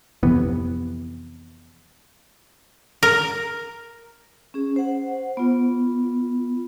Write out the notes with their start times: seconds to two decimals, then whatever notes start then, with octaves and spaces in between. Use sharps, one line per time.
0.23 F2 C3 E3 B3
3.03 A#4
4.54 C#4 G#4
4.76 C5 F#5
5.37 B3 F4